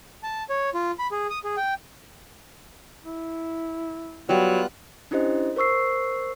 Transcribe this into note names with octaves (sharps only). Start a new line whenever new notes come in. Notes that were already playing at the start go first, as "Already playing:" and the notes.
A5
C#5
F4
B5
G#4
D#6
G#4
G5
E4
F#3 G3 B3 F4 C#6 F#6
C#4 D4 E4 G4 C5 D#5
A#4 C5 C#6 E6 C7